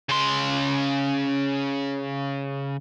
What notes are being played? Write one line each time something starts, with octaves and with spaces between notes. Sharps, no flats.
C#3 C6